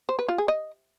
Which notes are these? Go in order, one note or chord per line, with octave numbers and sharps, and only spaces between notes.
C5
B4
F4
G#4
D#5